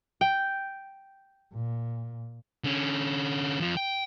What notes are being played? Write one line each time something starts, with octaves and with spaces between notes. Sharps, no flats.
G5
A#2
D3 C#4
F2 F3
G5